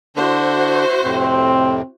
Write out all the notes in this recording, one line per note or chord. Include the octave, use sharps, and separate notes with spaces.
D3 D4 E4 F#4 C5
F2 A2 C3 C4